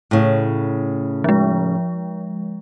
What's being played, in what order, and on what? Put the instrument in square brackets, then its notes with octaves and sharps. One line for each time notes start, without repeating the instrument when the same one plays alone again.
[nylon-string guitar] A2 C#3
[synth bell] F3 G#3